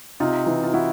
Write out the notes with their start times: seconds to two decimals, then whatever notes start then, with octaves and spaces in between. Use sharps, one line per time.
0.20 C3 D#4 F4
0.46 E3
0.64 F4
0.74 E3 E4 F#4